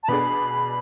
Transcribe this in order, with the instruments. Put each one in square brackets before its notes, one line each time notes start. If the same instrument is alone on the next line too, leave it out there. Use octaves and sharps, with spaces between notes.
[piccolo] A5
[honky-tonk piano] B2 B3 D4 G#4 [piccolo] B5